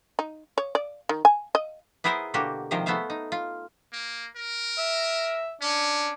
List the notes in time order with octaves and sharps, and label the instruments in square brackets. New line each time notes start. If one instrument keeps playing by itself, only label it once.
[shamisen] D#4
C#5
D5
D#3
G#5
D#5
[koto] B3 E4 G#4 A#4 C5 G#5
B2 D3 A#3 F#4 G4
C3 D#3 F3 G#3 A#4 C5
A3 B3 C5 E5 F5
D#4
F4
[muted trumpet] A#3
A#4
[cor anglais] E5
[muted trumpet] C#4 [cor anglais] D4